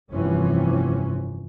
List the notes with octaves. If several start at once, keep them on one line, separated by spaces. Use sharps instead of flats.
F1 G2 C3 E3 C#4